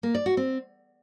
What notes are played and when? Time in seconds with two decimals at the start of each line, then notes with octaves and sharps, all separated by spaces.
0.03 A#3
0.15 D5
0.26 F#4
0.37 C4